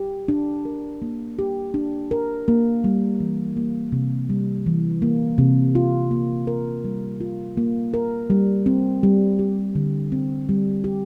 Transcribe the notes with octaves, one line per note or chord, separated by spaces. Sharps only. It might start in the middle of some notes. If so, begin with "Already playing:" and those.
Already playing: G4
D4
A#4
A#3
G4
D4
A#4
A#3
G3
E3
A#3
C3
G3
E3
A#3
C3
F4
A#3
A#4
G3
F4
A#3
A#4
G3
C4
G3
G4
D3
C4
G3
G4